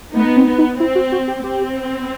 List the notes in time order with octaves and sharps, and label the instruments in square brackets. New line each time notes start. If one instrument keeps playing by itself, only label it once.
[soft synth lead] A3 [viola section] B3 D#4
[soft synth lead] C4
[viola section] B3
[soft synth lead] D#4
[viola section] C4 [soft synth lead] E4
[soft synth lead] F#4
F#4
G4
[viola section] C4 [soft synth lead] G4